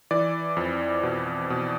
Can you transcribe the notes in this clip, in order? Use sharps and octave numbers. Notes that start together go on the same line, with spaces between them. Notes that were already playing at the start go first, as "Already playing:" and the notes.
E3 D5
F2
B2
B2